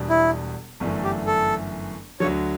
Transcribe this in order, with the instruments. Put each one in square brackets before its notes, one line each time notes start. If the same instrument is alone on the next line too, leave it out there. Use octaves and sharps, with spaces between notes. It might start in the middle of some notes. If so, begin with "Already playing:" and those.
Already playing: [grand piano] E1 E2 B2 G3 D4
[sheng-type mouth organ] E4
[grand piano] G1 F#2 E3 A3
[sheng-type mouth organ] G4
A4
[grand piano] D2 D3 F#3 [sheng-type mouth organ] C#5